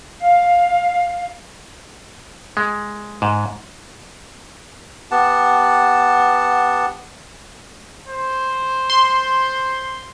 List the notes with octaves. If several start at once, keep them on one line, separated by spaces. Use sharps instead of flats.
F5
G#3
G#2
B3 G4 F#5 A5
C5
C6